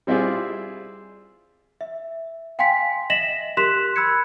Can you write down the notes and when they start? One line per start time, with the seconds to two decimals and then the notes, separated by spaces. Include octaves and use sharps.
0.07 G3 C4 E4 F4 G#4 D5
1.81 E5
2.59 F5 G5 G#5 C6 B6
3.10 D#5 E5 A#6 B6 E7 F#7
3.57 G4 A#4 C6 F#6 B6 E7
3.96 B5 E6 F#6 G#6 C#7